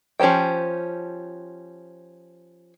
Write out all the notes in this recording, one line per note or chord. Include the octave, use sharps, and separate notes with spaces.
F3 C#4 G4 C5 G5